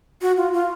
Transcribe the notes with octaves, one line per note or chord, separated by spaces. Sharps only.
F#4
F4
F4